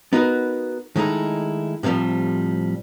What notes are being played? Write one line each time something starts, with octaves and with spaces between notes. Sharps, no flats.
B3 D#4 F#4 A#4 B4
D#3 G#3 A3 D#4 E4
A2 C3 E3 F3 G3